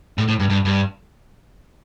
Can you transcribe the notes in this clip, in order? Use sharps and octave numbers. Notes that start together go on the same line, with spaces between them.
A2
A2
G2
G2
G2